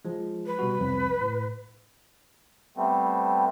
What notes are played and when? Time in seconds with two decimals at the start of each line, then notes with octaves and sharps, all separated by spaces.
0.05 F3 G#3
0.46 B4
0.59 B2 G3 F#4
0.79 C2 F2
1.21 A2
2.77 G3 A3 B3 C4